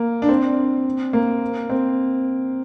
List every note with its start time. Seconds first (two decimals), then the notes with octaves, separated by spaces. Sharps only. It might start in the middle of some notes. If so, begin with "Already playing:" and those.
Already playing: A#3
0.22 D4
0.29 C4
1.13 A#3
1.70 C4